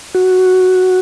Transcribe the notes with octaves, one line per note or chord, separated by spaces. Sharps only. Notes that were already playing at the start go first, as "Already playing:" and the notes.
F#4